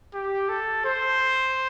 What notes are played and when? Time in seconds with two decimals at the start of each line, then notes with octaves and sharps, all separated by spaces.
0.14 G4
0.49 A4
0.85 C5